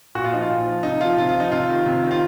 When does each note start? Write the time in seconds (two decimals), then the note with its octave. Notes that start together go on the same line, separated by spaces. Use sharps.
0.15 A#2 F#4
0.24 F4
0.32 F3 D#4
0.42 F4
0.49 A#2
0.66 F3
0.83 C3 D#4
1.01 F3 F4
1.18 C3 F4
1.29 F4
1.35 F3
1.40 D#4
1.52 C3 F4
1.69 D#3
1.86 C3
2.04 D#3
2.11 F4